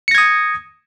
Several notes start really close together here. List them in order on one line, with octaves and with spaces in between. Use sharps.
C#7 A#6 G#6 D#6